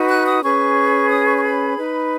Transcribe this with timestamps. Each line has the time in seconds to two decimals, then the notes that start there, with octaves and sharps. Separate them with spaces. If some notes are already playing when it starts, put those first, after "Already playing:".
Already playing: D#4 F#4 B4
0.09 F#6
0.26 D#6
0.42 C#4 G#4 B4 C#6
1.10 D#6
1.26 C#6
1.37 C#6
1.43 B5
1.77 D#4 B4